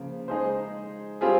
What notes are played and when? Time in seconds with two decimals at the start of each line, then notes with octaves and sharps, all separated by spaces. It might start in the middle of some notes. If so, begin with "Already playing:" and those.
Already playing: C#3 F3 A#3 F4
0.28 G#3 D#4 G#4 C5
1.21 G3 C4 F4 G#4